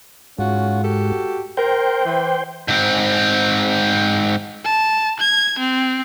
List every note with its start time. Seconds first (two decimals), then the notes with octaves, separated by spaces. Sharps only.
0.39 G#2 C#4 F4 F#4
0.83 F#4 G4 A4
1.57 A#4 C5 G5
2.06 E3
2.68 G#2 C4
4.65 A5
5.20 G#6
5.59 C4